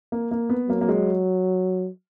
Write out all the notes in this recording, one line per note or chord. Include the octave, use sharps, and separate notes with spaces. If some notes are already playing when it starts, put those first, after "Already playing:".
A#3
A#3
B3
F#3 A#3
A#3
G#3